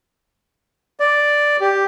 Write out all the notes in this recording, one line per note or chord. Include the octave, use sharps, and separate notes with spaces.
D5
G4